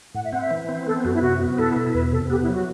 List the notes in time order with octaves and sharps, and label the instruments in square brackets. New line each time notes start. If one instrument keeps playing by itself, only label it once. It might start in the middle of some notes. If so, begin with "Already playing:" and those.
[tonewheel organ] A2 [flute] F#5
[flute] E5
[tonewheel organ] C4 [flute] F#5
[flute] E5
[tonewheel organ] E3
C4
[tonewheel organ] B3 [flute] A4
[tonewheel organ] F#2 [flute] F#4
[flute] E4
[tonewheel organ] C3 [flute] F#4
[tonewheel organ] B3
[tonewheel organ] E4 [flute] A4
[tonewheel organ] B2
[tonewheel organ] E2 [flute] B4
[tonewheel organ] C3 [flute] A4
[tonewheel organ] B3 [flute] G4
[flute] E4
[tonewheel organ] F#3
[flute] F#4